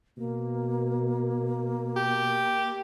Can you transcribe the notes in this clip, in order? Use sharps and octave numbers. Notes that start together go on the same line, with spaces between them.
B2 A#3
G4